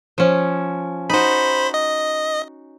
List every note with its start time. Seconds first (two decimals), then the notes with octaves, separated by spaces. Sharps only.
0.18 F3 C#4
1.10 D#4 F#4 C5 B5
1.74 D#5